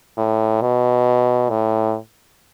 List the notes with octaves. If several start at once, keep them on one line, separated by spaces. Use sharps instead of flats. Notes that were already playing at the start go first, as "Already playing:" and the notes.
A2
B2
A2